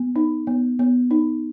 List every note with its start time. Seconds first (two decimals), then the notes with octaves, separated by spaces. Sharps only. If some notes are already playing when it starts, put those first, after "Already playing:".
Already playing: B3
0.16 D#4
0.47 B3
0.79 B3
1.11 D#4